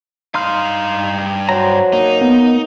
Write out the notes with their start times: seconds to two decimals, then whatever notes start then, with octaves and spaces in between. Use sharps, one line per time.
0.34 G2 D#4 F5 C6 F6
1.49 F#3 C5 A#5
1.93 A#3 D#4
2.21 B3